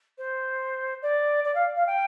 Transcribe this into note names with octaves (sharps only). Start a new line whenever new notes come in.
C5
D5
D5
F5
F5
G5